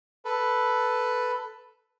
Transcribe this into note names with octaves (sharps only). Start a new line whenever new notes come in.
A4 B4